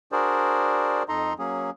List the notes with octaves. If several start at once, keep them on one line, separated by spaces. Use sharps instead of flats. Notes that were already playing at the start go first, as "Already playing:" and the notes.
D4 F#4 G#4 A#4 C5 D5
F2 D#4 A4 D#5 A#5 C6
F#3 A#3 C#4 G#4